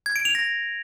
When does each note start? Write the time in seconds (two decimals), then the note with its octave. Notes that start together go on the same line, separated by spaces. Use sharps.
0.06 G#6
0.16 D7
0.25 F7
0.35 A#6